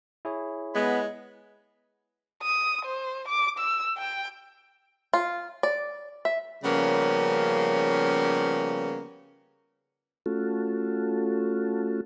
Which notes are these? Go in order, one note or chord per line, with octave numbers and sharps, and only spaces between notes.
E4 G#4 C#5
G#3 B3 B5
D#6
C5
D6
E6
G5
F4
D5
E5
C#3 F3 G3 A#3 B3 C#4
A3 C#4 F4 F#4 A4